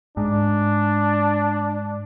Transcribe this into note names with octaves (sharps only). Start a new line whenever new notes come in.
G#2 D4